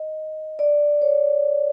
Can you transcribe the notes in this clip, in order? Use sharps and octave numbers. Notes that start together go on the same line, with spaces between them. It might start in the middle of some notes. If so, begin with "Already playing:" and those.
Already playing: D#5
D5
C#5